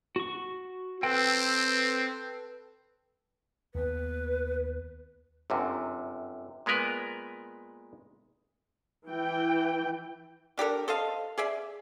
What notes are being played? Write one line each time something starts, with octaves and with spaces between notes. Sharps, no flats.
F#4 C#6
C4 A4 B4 G5
D#2 D#3 B3 B4
G1 F#2 C3
A#2 G#3 B3 A#4 B4
E3 G5
D4 G4 A4 A#4
A4 C5 D#5 F5
G#4 D5 E5